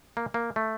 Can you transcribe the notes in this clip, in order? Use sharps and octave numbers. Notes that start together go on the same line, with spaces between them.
A#3
A#3
A3